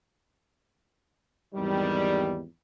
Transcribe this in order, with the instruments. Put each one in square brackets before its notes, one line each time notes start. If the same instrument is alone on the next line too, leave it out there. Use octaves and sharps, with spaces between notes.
[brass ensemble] G#1 E2 D#3 G3